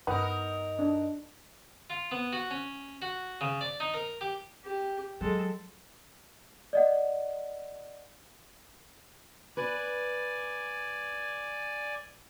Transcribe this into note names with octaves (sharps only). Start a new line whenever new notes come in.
G2 B3 D#4 A#4
D4
F4
B3
F#4
C#4
F#4
C#3
D5
D#4
A#4
G4
G4
F#3 G#3 A4
D5 D#5 F#5
B4 D5 G#5